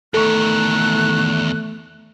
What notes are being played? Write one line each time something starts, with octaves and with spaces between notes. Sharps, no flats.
E2 D#3 A3 A4 C#6 F#6